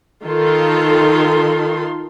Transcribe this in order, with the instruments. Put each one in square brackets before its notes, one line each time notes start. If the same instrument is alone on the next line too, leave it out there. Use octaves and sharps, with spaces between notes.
[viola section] D#3 F4 A4 C6